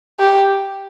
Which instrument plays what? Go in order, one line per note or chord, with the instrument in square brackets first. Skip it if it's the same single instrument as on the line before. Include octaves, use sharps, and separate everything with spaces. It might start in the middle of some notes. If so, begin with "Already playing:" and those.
[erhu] G4